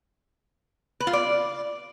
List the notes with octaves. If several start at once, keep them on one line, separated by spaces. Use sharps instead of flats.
B4
F4
D5